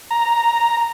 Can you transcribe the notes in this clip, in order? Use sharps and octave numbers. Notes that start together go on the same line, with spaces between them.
A#5